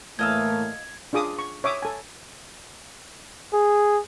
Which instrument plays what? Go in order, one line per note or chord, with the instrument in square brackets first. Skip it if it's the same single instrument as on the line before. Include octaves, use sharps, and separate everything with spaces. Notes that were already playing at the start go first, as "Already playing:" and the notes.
[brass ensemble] A2 E3 A#3 [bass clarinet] A3 [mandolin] D#5 F5 E6 [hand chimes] G#6
[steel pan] D4 F4 G#4 D6 D#6
C#6
C#5 E5 D6 D#6
A4 G#5
[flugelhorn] G#4